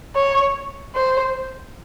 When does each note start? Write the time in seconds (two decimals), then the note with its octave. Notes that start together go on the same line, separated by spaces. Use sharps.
0.16 C#5
0.95 C5